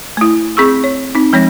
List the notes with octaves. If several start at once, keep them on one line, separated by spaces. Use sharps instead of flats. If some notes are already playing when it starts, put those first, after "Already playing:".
A3 E4
C4 G#4 C#6 E6
C#5
C4 D#4
F3 G#3 C4 C#5 A#6